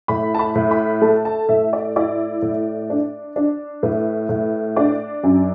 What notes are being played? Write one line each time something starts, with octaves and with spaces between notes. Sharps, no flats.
A2 B5
A5
B5
A2
B5
A3 A5
A5
A2 E5
D5
E4 D5
A2
D4
D4
A2 B4
A2
D4 D5
F#2